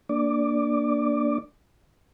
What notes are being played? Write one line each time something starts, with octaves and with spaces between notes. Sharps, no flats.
A#3 D4 D5 D6